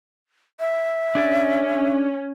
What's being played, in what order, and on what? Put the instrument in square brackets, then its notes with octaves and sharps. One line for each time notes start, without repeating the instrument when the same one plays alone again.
[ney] E5
[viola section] C#4 [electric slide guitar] D4 G#4 D5